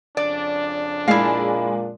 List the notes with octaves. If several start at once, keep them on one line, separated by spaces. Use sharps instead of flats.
F2 C#3 D4 D5
A#2 G#3 E4 F5